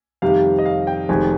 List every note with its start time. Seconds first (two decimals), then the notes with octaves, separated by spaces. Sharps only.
0.22 F2 C3 D#3 G3 F5
0.59 D#5
0.66 F5
0.87 G5
1.09 F1 F2 C3 D#3 G#3 G#5